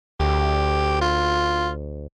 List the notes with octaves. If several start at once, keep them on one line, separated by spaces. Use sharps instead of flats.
D2 G4
F4